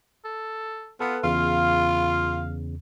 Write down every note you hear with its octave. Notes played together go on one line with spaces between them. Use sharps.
A4
B3 F4 A4 B4
E2 C#3 F4 F5